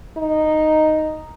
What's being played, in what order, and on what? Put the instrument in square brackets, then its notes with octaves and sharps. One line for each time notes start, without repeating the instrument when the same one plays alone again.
[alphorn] D#4